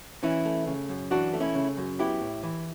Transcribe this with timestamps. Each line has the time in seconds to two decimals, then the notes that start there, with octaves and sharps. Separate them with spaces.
0.23 E3 C#4 E4
0.45 A3
0.67 C#3
0.89 F#2
1.11 E3 D4 F#4
1.33 A3
1.40 C#4 E4
1.55 C#3
1.77 F#2
1.99 B3 E4 G4
2.21 A2
2.43 E3